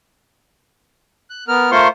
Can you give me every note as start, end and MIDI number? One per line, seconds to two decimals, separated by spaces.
1.30 1.44 90
1.48 1.71 59
1.48 1.71 70
1.48 1.71 89
1.71 1.88 57
1.71 1.88 65
1.71 1.88 70
1.71 1.88 72
1.71 1.88 84
1.71 1.88 85